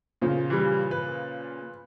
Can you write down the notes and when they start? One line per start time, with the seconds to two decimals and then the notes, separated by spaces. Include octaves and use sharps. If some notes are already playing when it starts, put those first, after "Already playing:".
0.22 A#2 C#3 F3
0.50 E3 G3
0.91 B4